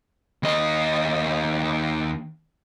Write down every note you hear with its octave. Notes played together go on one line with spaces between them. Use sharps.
D#2 D#5